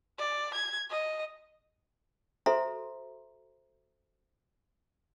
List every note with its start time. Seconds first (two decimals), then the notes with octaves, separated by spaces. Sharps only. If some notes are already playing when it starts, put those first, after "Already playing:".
0.18 D5
0.55 G#6
0.90 D#5
2.46 F#4 A4 C5 E5 A#5 C6